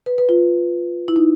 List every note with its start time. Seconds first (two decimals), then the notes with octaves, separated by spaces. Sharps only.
0.06 B4
0.18 B4
0.29 F4
1.08 E4
1.16 D#4